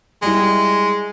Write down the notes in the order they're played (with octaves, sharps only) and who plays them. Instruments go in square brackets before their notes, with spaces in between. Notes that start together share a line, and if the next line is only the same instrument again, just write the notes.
[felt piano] G3 E4 [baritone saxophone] G#3